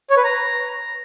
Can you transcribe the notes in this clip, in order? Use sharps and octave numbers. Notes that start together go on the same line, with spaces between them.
C#5
B4
A#5